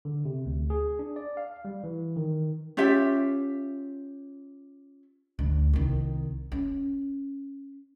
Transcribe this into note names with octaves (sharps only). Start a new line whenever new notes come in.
D3
C3
D2
G#4
D4
D5
F5
G3
E3
D#3
C#4 F4 G4 E5
D2
C2 D#3
C#4